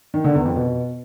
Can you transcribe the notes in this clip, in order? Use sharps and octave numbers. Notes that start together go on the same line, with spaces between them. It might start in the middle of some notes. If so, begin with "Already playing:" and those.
D#3
D3
E2
F2
B2